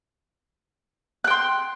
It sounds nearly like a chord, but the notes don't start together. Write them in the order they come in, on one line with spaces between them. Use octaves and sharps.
F#6 G5 C6